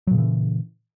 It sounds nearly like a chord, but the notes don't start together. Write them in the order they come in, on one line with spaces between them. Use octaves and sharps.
F#3 A#2 C#3 E3